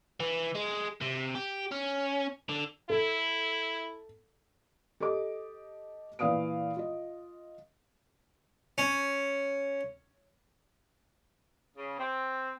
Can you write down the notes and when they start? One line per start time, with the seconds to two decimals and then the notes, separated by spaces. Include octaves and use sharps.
0.20 E3
0.55 G#3
1.02 C3
1.35 G4
1.72 C#4
2.49 D3
2.90 E4 A4
5.00 G4 A4 D#5 D6
6.19 A#2 E3 D5 F5 D#6 D7
6.77 F4 D#5
8.78 C#4
11.76 C#3
11.97 C4